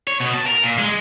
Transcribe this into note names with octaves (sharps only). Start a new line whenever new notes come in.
C#5
B2
A5
A#4
A#2
G#3